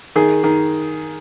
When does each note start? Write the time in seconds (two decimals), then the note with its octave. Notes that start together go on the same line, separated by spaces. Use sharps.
0.16 D#3 G#4
0.44 D#3